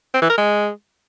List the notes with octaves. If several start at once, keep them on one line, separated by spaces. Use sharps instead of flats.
C4
E3
A#4
G#3